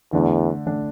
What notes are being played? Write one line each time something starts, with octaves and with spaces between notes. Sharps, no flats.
E2 D3 A3 D4
D3 A3 D4